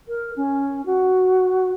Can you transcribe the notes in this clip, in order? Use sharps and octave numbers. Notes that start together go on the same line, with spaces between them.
A#4
C#4
F#4